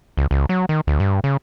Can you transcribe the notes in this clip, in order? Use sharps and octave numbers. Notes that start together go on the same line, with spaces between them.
C#2
C#2
F#3
D#3
D2
G2
C#3